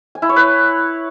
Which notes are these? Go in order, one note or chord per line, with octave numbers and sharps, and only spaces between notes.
G#5
E4
C#5
B4